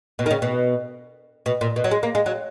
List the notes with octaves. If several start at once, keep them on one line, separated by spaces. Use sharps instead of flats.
B2
D#3
C#3
B2
B2
A#2
B2
F#3
G#3
A#3
G#3
F#3